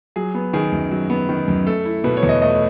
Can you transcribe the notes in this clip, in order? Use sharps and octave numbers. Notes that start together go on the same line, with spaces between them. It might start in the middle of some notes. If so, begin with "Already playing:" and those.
F#3 G#4
B3
D#3 G#4
F#2
F#3
B3
D#3
F#2
A3 A4
E4
B2 B4
C#5
E2
D#5
A3 D#5